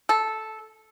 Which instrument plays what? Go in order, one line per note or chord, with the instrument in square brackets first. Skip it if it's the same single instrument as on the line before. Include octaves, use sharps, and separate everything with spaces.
[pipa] A4